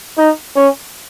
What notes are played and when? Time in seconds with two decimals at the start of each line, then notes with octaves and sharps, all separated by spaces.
0.18 D#4
0.56 C#4